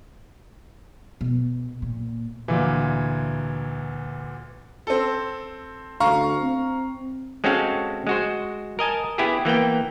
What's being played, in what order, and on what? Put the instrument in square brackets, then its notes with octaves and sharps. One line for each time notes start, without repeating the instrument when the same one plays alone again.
[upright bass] B2
A#2
[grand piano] D2 A#2 E3
C4 A4
[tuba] D2 [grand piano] F5 A#5 C#6
[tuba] C4
[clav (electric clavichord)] G#3 C4 C#4 F#4 A4 F5
G#3 F#4 C5
A#4 D#5 G#5 A5
B3 E4 G4 G#4
E3 A#3 B3 G5